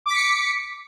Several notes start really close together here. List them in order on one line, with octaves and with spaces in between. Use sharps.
D6 B6 C#7